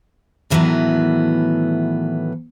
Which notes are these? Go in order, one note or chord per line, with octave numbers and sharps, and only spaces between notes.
A2 D#3 E3 F#3 A3 B3